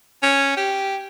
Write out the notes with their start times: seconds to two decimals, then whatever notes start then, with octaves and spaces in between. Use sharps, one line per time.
0.23 C#4
0.57 G4